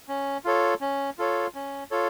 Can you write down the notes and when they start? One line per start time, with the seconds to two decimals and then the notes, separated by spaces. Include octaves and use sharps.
0.08 C#4
0.45 F4 A4 C#5
0.81 C#4
1.19 F4 A4 C#5
1.55 C#4
1.91 F4 A4 C#5